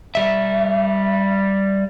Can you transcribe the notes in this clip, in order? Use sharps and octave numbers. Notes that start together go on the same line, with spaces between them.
G3 E5